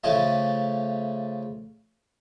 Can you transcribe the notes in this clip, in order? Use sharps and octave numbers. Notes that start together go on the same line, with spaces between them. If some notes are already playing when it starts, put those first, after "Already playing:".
C#3 F3 A3 D#5 A5